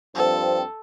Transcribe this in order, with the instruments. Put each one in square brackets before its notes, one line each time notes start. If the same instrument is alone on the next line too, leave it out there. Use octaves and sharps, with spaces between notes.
[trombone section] G2 F3 C4 [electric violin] A4